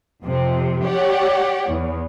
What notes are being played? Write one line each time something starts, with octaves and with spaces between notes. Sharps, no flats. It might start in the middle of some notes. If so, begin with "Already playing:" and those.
F2 C3
G4 C#5 D5 F#5
E2